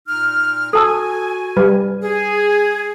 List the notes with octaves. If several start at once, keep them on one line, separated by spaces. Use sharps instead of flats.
A#2 D#4 F6
F#4 A4 G#5 A5 E6
G3 B4
G#4